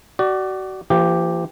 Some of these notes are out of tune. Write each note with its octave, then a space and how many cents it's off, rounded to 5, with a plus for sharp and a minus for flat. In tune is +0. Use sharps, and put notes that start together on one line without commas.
F#4 +30 D5 +10
F3 -45 A#3 +0 G4 +0